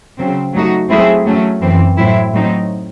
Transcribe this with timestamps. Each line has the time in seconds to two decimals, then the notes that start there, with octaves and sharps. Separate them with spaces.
0.18 C#3 F#3 C4
0.53 F#3 A3 D#4 F#4
0.89 F#3 A3 C4 E4 G#4
1.25 F#3 A3 C#4
1.61 F#2 E3 C4
1.97 A2 F#3 C4 E4
2.33 A2 F#3 C4 D#4